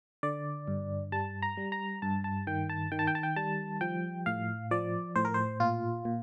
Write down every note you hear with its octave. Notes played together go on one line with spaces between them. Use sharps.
D3 D5
G2
G3 A5
A#5
G3
A#5
G2 A5
A5
D#3 G5
A5
D#3 G5
A5
G5
A5
G5
G3 A5
F3 G5
A2 F5
F3 D5
A2 C5
A#4
C5
A#2 F4
A#2